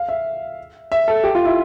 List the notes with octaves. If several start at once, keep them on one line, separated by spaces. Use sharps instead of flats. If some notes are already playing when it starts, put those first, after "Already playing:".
Already playing: F5
E5
E5
A4
G4
F4
E4